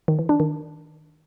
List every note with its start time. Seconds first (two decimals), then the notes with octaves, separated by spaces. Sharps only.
0.08 D#3
0.19 E3
0.29 D4
0.40 D#3